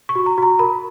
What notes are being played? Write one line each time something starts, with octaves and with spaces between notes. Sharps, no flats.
C#6
F#4
A#5
F#4 A#5
A#4 B5